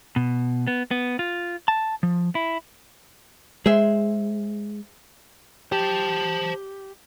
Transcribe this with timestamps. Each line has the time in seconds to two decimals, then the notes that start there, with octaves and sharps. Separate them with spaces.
0.16 B2
0.67 B3
0.91 B3
1.19 F4
1.68 A5
2.03 F3
2.35 E4
3.66 G#3 G#4 C5 E5
5.72 G4 C5 A5